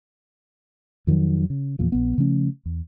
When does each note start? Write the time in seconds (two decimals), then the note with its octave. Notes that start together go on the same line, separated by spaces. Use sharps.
1.07 F2 D#3 F3 F#3
1.50 C#3
1.79 E2 A#2 F3
1.92 A#1 B3
2.18 C#3 F3 A3 C#4
2.65 E2